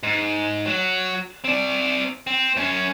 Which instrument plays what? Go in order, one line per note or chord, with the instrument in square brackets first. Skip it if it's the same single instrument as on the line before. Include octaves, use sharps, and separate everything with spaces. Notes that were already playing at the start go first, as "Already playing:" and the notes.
[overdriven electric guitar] G#2
F#3 F#4
C4 D5
C4
F#2 C#4